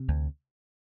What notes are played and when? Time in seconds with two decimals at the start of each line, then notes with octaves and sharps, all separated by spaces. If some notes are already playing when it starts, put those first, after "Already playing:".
Already playing: C3
0.08 D2